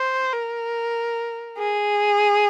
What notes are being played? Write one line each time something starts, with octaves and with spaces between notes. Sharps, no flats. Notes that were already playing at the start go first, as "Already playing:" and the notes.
Already playing: C5
A#4
G#4